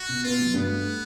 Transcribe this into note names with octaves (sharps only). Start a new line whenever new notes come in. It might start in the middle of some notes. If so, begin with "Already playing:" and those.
Already playing: F#4
B2
B3 F4
F#3
G2 B3
A3